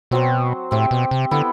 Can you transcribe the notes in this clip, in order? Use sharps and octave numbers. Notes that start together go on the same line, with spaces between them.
B2 F#3 C4 F#4 C5
A2 C4 G4 C5 E5
B2
C3
D3 B3 E4 A4